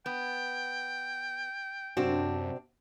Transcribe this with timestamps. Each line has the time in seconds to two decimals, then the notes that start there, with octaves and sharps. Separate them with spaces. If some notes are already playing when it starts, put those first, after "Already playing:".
0.06 B3 G5
1.97 F#2 C3 C4 D4 F#4